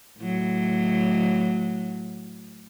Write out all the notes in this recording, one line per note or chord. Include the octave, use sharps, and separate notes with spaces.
A2 F#3